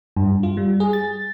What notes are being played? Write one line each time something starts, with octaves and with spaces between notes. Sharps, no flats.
G2
F4
G3
G#4
A6